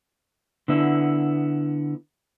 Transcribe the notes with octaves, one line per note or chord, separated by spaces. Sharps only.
D3 B3 E4